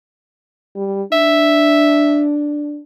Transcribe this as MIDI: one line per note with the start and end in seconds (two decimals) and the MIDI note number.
0.76 1.03 55
1.12 2.81 62
1.12 2.24 76